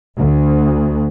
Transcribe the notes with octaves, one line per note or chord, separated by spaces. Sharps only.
D2